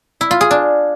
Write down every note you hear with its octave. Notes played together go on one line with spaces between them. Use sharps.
E4
F4
G#4
D4